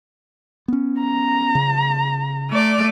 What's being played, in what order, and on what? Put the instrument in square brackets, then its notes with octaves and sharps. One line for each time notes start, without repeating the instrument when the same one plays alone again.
[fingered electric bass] B3 C#4
[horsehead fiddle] A#5
[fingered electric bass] C#3
[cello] A3 D5